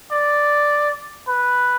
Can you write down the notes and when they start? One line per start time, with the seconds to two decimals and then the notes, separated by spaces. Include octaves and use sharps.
0.11 D5
1.28 B4